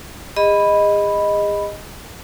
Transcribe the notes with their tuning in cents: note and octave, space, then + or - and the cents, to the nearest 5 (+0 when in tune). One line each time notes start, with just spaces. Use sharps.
G#4 -35 D#5 +0 B5 +0